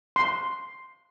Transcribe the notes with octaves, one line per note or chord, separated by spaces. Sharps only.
C6